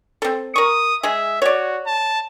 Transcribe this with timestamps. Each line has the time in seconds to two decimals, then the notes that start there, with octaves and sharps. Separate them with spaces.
0.22 C4 A4
0.56 A#4 C#6 D#6
1.03 G#3 G#4 E5
1.42 F#4 C#5 D5
1.87 A5